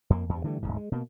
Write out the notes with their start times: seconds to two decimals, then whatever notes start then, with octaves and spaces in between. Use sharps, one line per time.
0.10 F2 A#3
0.29 E2 G2
0.44 D3 E3 G3 A3
0.62 D1 C#2 G#2
0.76 G#3
0.92 B2 A#3